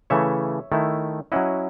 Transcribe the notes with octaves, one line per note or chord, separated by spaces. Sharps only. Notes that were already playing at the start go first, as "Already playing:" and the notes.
C#3 E3 A3 C#5 E5
D#3 A3 E4
F#3 C#4 E4 D#5 F#5